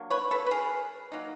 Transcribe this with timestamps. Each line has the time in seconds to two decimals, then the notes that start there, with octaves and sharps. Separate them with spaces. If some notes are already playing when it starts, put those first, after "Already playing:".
Already playing: F#3 A#3 D4
0.10 B4 C#5
0.31 A4 B4
0.46 B4
0.51 G#4 A#4
1.12 F#3 A#3 D#4